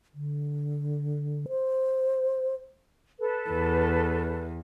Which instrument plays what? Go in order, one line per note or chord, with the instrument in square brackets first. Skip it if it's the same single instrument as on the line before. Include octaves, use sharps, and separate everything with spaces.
[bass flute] D3
C5
[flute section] A4 B4
[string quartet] E2